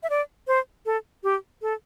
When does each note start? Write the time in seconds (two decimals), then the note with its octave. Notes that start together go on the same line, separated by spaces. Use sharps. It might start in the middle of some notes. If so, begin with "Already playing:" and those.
0.03 E5
0.10 D5
0.47 C5
0.86 A4
1.23 G4
1.62 A4